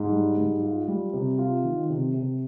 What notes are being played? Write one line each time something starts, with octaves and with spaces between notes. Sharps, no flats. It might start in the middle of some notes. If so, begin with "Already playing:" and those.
Already playing: G#2
G3
G#2
F4
G3
C3
F4
D#3
C3
C3